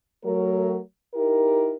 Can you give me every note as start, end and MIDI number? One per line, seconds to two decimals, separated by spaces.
0.24 0.79 54
0.24 0.79 57
0.24 0.79 70
1.15 1.75 63
1.15 1.75 64
1.15 1.75 67
1.15 1.75 70